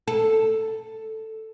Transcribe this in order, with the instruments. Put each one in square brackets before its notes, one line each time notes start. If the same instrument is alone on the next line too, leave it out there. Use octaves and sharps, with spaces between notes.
[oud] A4